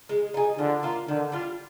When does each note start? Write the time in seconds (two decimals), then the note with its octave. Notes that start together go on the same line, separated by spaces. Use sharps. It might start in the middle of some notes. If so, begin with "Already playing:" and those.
0.09 G#3
0.34 D#4 G#4
0.58 D3 F3
0.83 A#3 F4
1.08 D3 D#3
1.32 G3 D4 F4